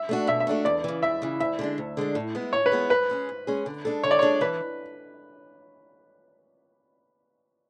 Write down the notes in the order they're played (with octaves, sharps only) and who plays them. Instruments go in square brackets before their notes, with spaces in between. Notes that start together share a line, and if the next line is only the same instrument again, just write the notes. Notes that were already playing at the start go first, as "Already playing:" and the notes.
Already playing: [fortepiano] E5
[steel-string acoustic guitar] A3 D4 F#4
[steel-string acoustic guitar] B2 [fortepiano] E5
[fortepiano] E5
[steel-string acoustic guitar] A3 D4 F#4
[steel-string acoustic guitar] E2 [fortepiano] D5
[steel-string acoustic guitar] C#3 E3
[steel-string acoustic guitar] E2 [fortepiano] E5
[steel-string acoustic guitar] C#3 E3
[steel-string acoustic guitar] D2 [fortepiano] E5
[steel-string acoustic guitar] D3 G#3 D4
D2
D3 G#3 D4
A2
G#3 B3 E4
[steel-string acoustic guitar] A2 [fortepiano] C#5
[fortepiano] B4
[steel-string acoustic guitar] G#3 B3 E4
[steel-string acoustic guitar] G#2 [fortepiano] B4
[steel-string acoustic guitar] G#3 C#4 G#4
G#2
G#3 C#4 G#4
D3
G#3 D4 A4
[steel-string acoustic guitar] D3 [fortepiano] C#5
[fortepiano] D5
[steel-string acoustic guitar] G#3 D4 A4 [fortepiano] C#5
[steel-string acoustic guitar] E3 [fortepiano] B4